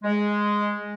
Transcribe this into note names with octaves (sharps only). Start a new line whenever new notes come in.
G#3